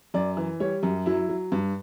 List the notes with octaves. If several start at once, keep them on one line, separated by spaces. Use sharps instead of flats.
F#2 D5
E3
G3 C#5
F#2
F#3 E4
F#3
G2